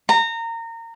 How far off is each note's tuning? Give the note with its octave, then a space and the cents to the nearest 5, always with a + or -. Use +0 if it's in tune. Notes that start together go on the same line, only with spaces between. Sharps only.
A#5 -25